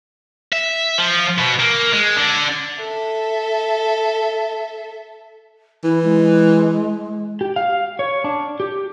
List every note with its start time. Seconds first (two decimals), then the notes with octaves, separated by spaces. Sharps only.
0.53 E5
0.98 F3
1.38 B2
1.59 A#3
1.93 G#3
2.16 D3
2.79 A4 E5
5.84 E3 E4
6.04 G#3
7.41 G4
7.56 F5
7.99 C#5
8.24 D4
8.60 G4